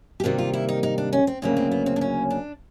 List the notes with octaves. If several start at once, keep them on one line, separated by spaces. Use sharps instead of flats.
G4
C3 D#3 G3 A#3 F#4
F4
E4
D#4
D#4
D4
C#4
C4
D2 C#3 F#3 A#3 C4
C4
B3
C4
D4
C#4
D4